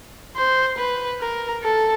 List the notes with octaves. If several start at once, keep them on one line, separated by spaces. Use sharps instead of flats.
C5
B4
A#4
A4